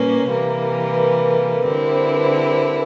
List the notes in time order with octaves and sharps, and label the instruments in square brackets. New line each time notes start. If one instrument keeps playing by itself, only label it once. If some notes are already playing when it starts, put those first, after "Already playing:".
Already playing: [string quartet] A#2 G3 A#3 C#4 [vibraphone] B4
[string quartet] C3 E3 G3 A#3
[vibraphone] B4
A#4
A4
[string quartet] D3 G3 C4 E4 [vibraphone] A#4
[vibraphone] C5
B4